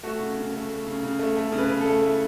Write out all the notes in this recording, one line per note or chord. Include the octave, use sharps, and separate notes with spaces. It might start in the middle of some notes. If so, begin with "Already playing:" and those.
A3 F#4
C#3
C#3
A3
A3
C#3
C#3
A3
A3
C#3
B4
C#3
A4
A3
A3 E4